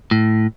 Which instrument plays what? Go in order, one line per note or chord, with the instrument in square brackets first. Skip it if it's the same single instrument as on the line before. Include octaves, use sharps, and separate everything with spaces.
[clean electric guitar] A2